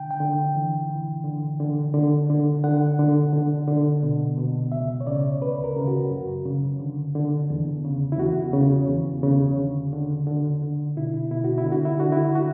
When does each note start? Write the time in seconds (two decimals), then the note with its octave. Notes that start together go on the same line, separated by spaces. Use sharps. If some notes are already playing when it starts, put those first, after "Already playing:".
Already playing: D3 G5
0.11 G5
0.20 D3
0.56 E3
0.90 E3
1.24 D3
1.60 D3
1.94 D3
2.30 D3
2.64 D3 F#5
2.99 D3
3.33 D3
3.68 D3
4.03 B2
4.38 B2
4.72 C#2 E5
5.01 C#5
5.07 C#3 D5
5.41 D2 B4
5.64 A#4
5.76 C#3
5.87 F#4
6.11 F#2
6.45 C#3
6.80 D3
7.15 D3
7.50 E2
7.85 C#3
8.12 E4
8.18 E2 F#4
8.53 C#3
8.88 E2
9.23 C#3
9.58 D3
9.93 D3
10.27 D3
10.62 D3
10.96 B2 E4
11.31 B2 E4
11.44 F#4
11.58 E4
11.66 D3
11.72 F#4
11.85 E4
12.00 D3 F#4
12.12 E4
12.35 F#4